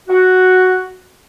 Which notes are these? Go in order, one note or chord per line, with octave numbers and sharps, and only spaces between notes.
F#4